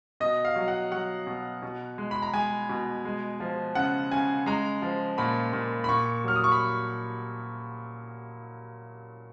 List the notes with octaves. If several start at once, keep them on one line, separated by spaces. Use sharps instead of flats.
B2 D#5
F5
F#3
F#5
F#3 F#5
B2
B2
G#3
B5
A#5
G#3 G#5
B2
G#3
F3
C#3 F#5
C#3 G#5
G#3 A#5
F3
A#2 B5
A#2
B5
A#2 C#6
F#3 F6
D#6
C#6
B5